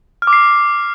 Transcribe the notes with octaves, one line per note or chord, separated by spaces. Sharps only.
F6
D6
C7